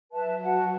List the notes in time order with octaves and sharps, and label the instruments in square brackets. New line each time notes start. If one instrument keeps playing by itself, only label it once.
[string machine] F#3 [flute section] B4 E5 A5
[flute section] F#4 B4 F#5 A5